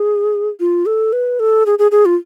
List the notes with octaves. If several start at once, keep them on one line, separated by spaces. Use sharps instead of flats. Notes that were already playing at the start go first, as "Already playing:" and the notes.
Already playing: G#4
F4
A4
B4
A4
G#4
G#4
G#4
F4